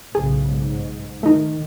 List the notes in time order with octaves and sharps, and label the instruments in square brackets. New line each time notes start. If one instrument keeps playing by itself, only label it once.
[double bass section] B1 A2 C#3 [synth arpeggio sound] G#4
[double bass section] G#2
[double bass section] D#3 [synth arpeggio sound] A3 D#4